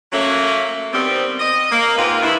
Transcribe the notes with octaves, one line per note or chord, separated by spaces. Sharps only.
F#3 A3 A#3 C#4
D#3 G3 B3 C4
D#5
A#3
G#2 C4 F4 A#4 B4
G2 E3 E4